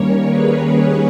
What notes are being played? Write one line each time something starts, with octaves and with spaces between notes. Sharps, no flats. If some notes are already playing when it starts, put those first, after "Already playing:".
Already playing: D#2 D#3 G3 A#3 C#4 A#4 C#5
G#4 B4